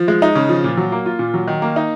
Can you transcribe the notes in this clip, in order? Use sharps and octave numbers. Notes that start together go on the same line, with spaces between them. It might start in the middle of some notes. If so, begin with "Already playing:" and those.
Already playing: F3
G#3
D#4
C#3
F3
A#2
F#3
A#3
F4
A#2
F#3
D#3
A#3
D#4